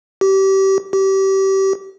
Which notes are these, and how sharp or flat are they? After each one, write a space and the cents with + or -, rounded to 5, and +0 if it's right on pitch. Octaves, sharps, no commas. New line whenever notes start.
G4 -25
G4 -25